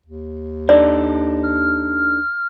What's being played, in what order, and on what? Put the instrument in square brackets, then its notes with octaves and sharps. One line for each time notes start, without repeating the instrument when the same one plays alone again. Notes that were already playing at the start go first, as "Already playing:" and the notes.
[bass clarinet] D#2
[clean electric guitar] D4 D#4 A4 [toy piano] D5
[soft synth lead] F6